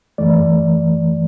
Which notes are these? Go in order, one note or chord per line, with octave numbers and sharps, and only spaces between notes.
F#2 E3 A3 D5